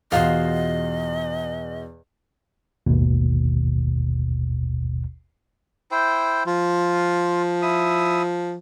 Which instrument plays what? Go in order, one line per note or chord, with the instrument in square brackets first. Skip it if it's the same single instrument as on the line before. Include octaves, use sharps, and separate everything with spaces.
[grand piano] E2 B2 [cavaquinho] F4 F#4 C5 [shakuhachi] D#5
[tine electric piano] G#1 D#2 B2
[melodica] E4 C5 G5
[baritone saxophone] F3 [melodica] F4
[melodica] E4 E5 D#6